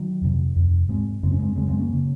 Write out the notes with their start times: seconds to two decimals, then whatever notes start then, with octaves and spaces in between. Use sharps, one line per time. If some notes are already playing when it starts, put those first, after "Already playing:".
Already playing: D#3 F#3
0.21 F2 C3
0.56 F2 C3
0.89 G#2 G#3 C4
1.23 F#2 C#3 C4
1.32 C#4
1.39 G#3 C4
1.56 C#3 G#3 C4
1.60 F#2
1.68 G#3 C4
1.79 A#3 C#4
1.93 C#3